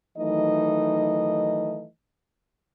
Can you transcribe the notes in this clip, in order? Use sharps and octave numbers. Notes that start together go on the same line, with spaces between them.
D#3 E3 F#3 A3 D#4 D#5